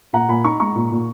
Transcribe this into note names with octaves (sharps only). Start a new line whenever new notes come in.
A#2 F#5 A#5
A#2 G#5 B5
D#4 A#5 C#6
G#3 A#5 C#6
A#2
A#2